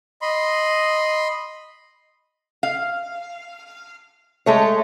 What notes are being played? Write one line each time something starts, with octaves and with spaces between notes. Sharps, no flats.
D#5 B5 C6
F5
G#3 A3 C#5